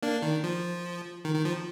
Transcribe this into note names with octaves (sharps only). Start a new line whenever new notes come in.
A#3 D4
D#3
F3
D#3
D#3
F3